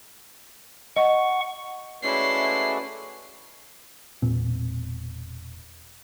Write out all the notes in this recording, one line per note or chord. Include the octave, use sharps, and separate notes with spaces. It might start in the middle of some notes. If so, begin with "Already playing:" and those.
D#5 F#5 C#6
G#3 A3 C#4 E4 F#4 B4 D5 C7
E1 A#2 C4